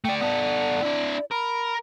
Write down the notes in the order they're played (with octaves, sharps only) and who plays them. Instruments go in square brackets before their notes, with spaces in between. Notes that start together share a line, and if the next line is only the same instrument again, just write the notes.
[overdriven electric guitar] A3 D5 [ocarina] G5
[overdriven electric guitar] B3 A4 [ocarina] D5
[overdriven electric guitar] D4 E4
[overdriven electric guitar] A#4 [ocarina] B5